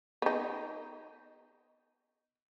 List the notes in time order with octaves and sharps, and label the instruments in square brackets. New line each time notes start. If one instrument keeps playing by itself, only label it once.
[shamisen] B3 D#4